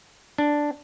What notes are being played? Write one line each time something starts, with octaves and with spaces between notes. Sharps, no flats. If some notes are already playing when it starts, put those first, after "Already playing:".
D4